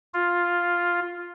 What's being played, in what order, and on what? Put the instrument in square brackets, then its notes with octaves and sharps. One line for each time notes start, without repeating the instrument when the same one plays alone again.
[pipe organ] F4